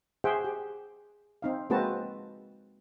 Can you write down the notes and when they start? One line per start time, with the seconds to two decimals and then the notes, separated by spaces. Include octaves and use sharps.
0.24 G#4 C5 E5 F#5 G5
0.44 G4
1.42 C4 D#4 F5
1.70 G#3 A#3 C4 F#4 B4 A5